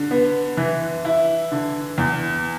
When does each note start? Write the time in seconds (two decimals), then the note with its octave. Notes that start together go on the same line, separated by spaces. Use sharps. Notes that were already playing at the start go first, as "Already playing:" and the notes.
Already playing: D3
0.11 B3
0.57 E3
1.05 E4
1.52 D3
1.98 E2